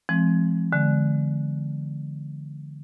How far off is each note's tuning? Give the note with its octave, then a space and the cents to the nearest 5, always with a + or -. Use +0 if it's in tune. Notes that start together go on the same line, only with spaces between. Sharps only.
F3 -45 G#3 +20 C4 +0
D3 +0 G#3 +20